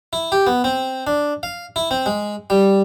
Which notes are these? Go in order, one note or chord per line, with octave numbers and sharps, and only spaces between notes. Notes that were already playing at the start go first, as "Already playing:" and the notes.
E4
G4
B3
C4
D4
F5
E4
C4
G#3
G3